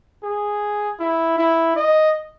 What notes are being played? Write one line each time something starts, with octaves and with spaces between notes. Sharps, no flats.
G#4
E4
E4
D#5